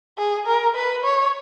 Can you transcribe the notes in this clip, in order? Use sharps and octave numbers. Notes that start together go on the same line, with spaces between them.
G#4
A#4
B4
C#5